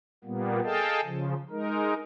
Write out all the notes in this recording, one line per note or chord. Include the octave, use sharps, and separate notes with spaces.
A#2 G3 A#3 B3
G#4 A4 D#5 F5 G5 A5
C#3 F3
G#3 D#4 A#4